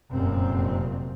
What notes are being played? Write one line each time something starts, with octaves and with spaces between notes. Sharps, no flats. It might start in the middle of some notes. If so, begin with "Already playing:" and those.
F1 F#2 A#2 C4